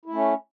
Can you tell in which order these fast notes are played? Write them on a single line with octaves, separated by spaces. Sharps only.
E4 A3 C#4